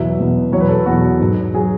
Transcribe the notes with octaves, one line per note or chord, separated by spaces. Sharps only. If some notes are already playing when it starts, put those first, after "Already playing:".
Already playing: E2 B2 F#3 E5
E2 B2 F#3
E2 B2 F#3 C#5
B4
A4
E2 B2 F#3 F#4
G#2 F#3
F#3 G#4